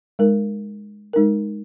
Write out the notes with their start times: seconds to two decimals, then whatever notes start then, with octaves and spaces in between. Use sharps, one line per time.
0.19 G#3 D#4 A#4
1.13 G#3 D#4 A#4